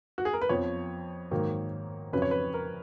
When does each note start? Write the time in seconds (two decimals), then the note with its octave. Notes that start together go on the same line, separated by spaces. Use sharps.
0.18 F#4
0.25 G#4
0.33 A#4
0.42 B4
0.49 F2 F3 B3 C#5
1.31 G#2 D#3 F#3 A#3
2.13 F2 C#3 F#3 C#4 B4
2.22 C#5
2.31 B4
2.54 A#4